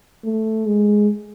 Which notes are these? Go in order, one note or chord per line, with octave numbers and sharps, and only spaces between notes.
A3
G#3